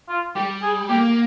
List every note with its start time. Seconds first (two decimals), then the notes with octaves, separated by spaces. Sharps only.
0.09 F4
0.36 G3 G4
0.62 G#4
0.89 A#3 G4